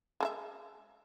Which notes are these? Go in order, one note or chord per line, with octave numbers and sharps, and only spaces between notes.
G#3 A4 E5